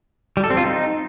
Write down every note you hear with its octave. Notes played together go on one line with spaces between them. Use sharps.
G3
A4
C4
F4
D#4